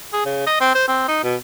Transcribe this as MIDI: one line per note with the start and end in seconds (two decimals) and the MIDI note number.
0.13 0.24 68
0.26 0.45 49
0.47 0.60 75
0.60 0.73 60
0.75 0.84 72
0.88 1.04 60
1.08 1.22 63
1.24 1.36 47